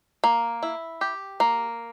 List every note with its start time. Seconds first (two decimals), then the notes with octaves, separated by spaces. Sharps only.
0.24 A#3
0.63 E4
1.01 G4
1.40 A#3